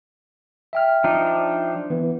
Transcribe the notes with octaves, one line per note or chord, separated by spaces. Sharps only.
E5 G5 F6
F3 D4 D#4
E3 B3